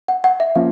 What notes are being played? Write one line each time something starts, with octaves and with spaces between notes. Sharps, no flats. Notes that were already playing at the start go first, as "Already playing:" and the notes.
F#5
F#5
E5
F3 A#3 C#4 F5